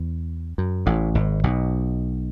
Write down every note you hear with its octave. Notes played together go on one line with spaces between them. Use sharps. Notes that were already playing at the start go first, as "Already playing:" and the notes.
Already playing: E2
F#2
A1 A2
G#1 G#2
B1 B2